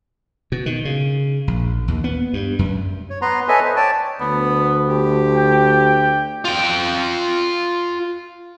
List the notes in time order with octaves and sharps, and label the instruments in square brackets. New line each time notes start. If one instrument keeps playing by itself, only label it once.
[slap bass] B2
D#3
C#3
A#1
D#2
B3
G2
F#2
[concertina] C#5
B3 B4 A#5 C6
A4 B4 C#5 D#5 E5 G#5
C5
C#5 D5 G5 A5
[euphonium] D2 [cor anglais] B3
[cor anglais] G4
[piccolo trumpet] G5
[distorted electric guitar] F4 G5